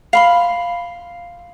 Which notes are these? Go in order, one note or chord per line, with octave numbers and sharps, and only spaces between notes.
F5 B5 C6